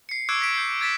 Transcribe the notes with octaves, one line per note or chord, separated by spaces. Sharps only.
C7 C#7
C#6 D6 E6 F#6 G#6 D7
A#6 B6 D7
G6 C7
C7
E6 G#6 A6 B6 E7